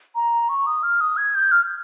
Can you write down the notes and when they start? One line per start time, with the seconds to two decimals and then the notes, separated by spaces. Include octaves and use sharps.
0.15 A#5
0.49 C#6
0.66 D#6
0.83 F6
1.01 D#6
1.17 G#6
1.35 G6
1.52 F6